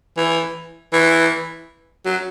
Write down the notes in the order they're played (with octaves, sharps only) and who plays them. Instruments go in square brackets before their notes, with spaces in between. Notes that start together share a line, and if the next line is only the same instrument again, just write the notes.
[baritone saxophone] E3
E3
F#3